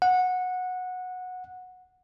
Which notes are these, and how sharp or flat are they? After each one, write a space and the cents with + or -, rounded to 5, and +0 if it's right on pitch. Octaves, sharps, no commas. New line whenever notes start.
F#5 -15